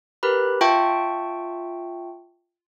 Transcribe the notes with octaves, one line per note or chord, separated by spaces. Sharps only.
G4 A#4 B4 B5
F4 E5 G5 A5 C#6